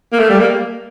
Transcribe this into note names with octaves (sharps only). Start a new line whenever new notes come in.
A#3
A3
G3
A#3